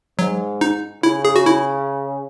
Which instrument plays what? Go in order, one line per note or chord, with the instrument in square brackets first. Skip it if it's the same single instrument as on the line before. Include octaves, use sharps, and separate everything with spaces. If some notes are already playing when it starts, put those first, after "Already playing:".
[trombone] G#2 [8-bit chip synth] F#3
[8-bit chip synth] D#4
[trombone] C#3 [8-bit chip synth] E4
[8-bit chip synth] G#4
F#4
E4